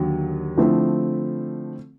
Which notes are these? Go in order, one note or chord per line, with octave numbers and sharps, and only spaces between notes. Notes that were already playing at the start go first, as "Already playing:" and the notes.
Already playing: D#2 D3 F#3
D3 F3 A3 C4 E4